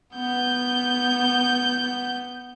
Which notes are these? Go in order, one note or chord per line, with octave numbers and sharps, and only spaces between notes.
B3 G6